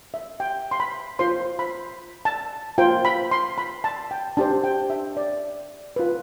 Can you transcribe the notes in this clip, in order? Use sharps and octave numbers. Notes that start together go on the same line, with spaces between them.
E5
G5
C6
B5
F4 C5 C6
B5
A5
F4 C5 G5
B5
C6
B5
A5
G5
D4 G4 C5 A5
G5
E5
D5
F4 B4